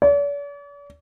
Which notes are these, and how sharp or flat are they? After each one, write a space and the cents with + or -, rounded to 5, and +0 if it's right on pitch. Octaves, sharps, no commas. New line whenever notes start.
D5 -45